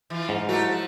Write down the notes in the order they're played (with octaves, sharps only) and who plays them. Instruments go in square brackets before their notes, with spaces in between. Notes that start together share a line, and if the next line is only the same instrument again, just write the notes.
[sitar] E3 F4
[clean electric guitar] G#2
[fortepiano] F#3 E4 [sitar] A3 G4 A#4
[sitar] F3